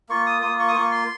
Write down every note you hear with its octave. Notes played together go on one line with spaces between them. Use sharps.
A#3 F4 C#6
D#6
A#3 F4 D#6
C#6
D#6
A#3 F4 C#6
C6